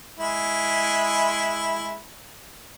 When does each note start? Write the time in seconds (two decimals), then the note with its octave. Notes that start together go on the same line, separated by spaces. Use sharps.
0.19 G#3 E4